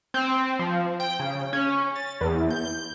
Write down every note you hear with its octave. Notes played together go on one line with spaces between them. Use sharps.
C4
F3
G5
C#3
C#4
A6
E2
G6